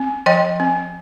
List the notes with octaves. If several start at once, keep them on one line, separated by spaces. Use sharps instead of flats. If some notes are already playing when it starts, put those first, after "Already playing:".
Already playing: C4
F3 D#5 G5
C4